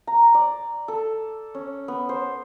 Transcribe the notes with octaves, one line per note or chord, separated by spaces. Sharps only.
A#5
D5
A4
C#4
B3
C5